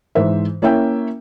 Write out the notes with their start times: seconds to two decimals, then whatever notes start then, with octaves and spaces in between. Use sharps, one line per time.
0.15 G#2 E3 C5 E5
0.62 A#3 C#4 E4 E5 G5